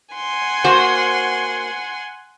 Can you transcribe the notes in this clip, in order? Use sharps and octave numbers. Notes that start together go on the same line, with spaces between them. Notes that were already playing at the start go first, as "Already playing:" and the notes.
F#5 G#5 C6
A#3 F#4 C5